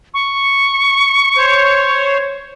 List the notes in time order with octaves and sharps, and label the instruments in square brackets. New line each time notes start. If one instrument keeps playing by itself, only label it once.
[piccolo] C#6
[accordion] C5 C#5